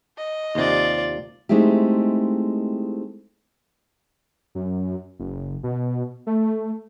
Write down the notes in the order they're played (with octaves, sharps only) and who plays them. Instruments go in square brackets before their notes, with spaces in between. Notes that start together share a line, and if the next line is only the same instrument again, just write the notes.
[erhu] D#5
[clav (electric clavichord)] D#2 C3 [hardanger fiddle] F4 D5
[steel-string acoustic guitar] G#3 A3 C4 D#4 E4 G4
[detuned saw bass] F#2
F#1
B2
A3